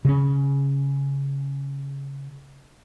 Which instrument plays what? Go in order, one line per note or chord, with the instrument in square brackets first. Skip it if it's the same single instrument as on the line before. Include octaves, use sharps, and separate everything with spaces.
[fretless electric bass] C#3 C#4